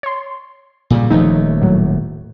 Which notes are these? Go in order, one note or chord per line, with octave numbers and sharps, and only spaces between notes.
C#5 C6
A#2 C#3 G3
D#1 D#2 E3 F3 A3 D#4
A2 F#3